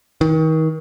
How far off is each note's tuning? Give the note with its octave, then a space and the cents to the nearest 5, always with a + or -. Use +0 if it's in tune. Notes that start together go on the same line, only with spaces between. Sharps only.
D#3 +35